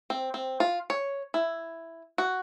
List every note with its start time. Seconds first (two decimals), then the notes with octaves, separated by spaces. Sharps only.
0.10 C4
0.34 C4
0.60 F4
0.90 C#5
1.34 E4
2.18 F#4